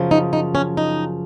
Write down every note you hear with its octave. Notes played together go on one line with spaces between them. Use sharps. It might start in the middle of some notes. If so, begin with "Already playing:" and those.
Already playing: F#2 C#3 F3
D#4
D#4
C#4
D#4